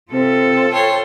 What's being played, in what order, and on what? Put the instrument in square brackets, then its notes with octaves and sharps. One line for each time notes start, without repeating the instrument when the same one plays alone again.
[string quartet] C3 [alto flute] C4 [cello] F4 A4
[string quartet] C5 C#5 C6 [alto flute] G5